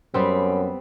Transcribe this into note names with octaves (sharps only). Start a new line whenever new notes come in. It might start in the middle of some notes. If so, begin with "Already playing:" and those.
F#2 G3 B3 C4